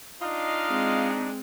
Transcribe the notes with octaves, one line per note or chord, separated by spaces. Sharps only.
D4 D#4 F4 D#5 F5
G#3 C4